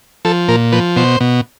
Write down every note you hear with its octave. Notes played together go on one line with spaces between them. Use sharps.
F3 A4
A#2 A#4
F3 B4
B2 C5
B2